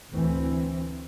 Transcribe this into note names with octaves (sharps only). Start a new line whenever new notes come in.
D2 E3 C4